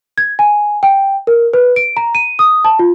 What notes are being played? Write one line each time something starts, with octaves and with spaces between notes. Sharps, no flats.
G#6
G#5
G5
A#4
B4
D7
A#5
D#7
D#6
A5
F4